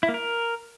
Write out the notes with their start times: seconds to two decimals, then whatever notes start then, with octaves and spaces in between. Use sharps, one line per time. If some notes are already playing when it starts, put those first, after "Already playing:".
0.03 E4
0.09 A#3
0.14 A#4